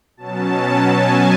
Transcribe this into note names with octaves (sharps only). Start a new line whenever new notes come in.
B2 F#3 C#4 A5
G#5